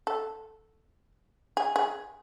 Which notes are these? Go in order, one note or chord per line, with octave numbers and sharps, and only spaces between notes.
A4
G#4
G#4